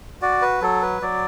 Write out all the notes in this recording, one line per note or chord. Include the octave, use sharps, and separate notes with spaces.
F#4 D5
B4
F#3 A4
B4
F#3 D5